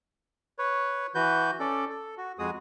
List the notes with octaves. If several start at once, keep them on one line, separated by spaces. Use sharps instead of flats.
B4 C#5
E3 F#4 B4 G6
C#4 A4 D5
A4
F#4
F2 G#3 F#4 G#4 D#6